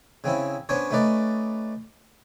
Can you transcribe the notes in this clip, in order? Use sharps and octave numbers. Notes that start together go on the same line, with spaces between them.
C#3 C4 C#4 E4
B3 C#4 D4 C5 C#5
A3 C#4 D#4 B4 D5